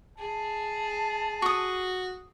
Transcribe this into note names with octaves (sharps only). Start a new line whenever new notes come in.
G#4 A5
F#4 C#6 D#6